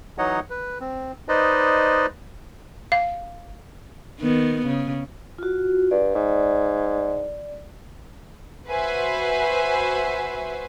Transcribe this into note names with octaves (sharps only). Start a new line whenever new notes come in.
E3 F#3 D#4 C#5 D#5 F#5
B4
C4
D#4 B4 C5 D5 D#5
F5
D#3 B3
C#3
F4 F#4
G2 D5
G#2
F#4 B4 C5 E5 G#5